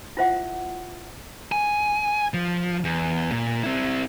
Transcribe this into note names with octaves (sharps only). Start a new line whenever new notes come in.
E4 F4 C5 E5 F#5
G#5
F3
E2
A#2
C4 E4